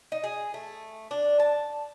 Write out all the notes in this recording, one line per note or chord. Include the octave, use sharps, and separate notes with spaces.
D#4
G#4
A3
D4
A5